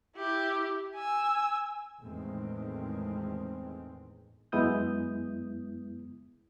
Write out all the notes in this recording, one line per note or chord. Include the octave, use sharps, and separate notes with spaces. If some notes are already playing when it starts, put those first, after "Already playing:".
E4 G4
G#5 E6
E2 A2 D#3 G#3 A3 C4
F#2 G#3 B3 E4 D#6 G6